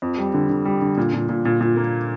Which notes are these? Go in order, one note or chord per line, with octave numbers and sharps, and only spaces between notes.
F2
G3
D3
D3
G3
D3
A#2
A#2
A#2
A#2
A#2
A#3